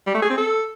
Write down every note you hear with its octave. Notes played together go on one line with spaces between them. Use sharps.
G3
A3
G#4
C4
A4